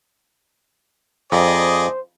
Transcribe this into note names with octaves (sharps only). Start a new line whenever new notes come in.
F2 G#4 C5 D5 D#5